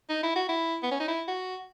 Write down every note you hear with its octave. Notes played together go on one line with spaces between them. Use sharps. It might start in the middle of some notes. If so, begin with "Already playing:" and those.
D#4
E4
F#4
E4
B3
C#4
D#4
E4
F#4